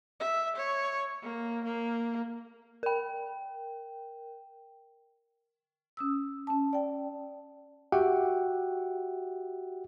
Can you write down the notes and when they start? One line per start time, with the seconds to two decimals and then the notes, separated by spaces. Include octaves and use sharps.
0.20 E5
0.56 C#5
1.23 A#3
1.64 A#3
2.83 A#4 G5
5.97 C#4 D#6 E6
6.47 C#4 A5
6.73 D5 G5
7.92 F#4 G4 E5 F#5 G5